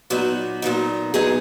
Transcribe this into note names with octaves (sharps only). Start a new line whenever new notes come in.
A#2 F#3 B3 D#4 F#4
A#2 F#3 B3 D#4
A#2 F#3 B3 D#4 G#4